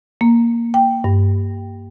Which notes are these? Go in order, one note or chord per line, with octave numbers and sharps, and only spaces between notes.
A#3
G5
G2